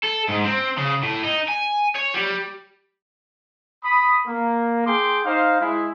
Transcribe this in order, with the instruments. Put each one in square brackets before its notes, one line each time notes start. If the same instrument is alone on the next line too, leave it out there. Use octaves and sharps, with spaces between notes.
[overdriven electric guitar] A4
G#2
C4
C#3
A2
D#4
G#5
C#5
G3
[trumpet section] B5 D#6
A#3
G#4 G5 C6 D6
D#4 C5 F5
G#3 E4